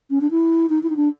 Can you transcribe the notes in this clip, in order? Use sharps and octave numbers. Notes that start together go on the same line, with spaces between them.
C#4
D4
E4
D#4
E4
D#4
D4